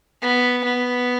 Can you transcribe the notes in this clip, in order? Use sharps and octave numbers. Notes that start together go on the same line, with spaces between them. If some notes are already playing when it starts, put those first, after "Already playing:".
B3
B3